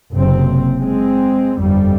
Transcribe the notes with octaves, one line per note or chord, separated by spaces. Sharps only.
F#1 C3 C4
G#3 C4
G1 F2 G3